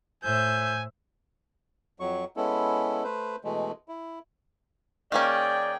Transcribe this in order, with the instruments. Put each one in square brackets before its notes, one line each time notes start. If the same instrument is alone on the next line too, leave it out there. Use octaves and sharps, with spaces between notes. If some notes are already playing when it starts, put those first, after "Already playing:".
[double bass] A2 [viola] C5 E5 [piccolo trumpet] G#5 [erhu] G6
[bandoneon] F2 F#3 C#6
G#3 B3 C#4 E4 A4
A3 B4 C5
B2 E3 G#3 A3
E4
[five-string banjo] D#3 A#3 C#4 [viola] G#4 G5 [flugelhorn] D5